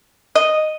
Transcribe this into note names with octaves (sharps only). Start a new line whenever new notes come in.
D#5